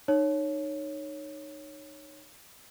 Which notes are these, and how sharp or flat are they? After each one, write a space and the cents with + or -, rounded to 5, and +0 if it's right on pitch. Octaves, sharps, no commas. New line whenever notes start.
D#4 -25 C#5 +0